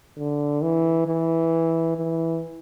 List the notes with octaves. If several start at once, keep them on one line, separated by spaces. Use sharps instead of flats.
D3
E3
E3
E3